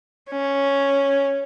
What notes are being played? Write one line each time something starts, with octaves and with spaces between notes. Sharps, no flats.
C#4